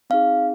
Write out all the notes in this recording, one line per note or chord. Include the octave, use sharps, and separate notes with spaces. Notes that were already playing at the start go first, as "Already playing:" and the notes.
C4 D#4 G#4 F5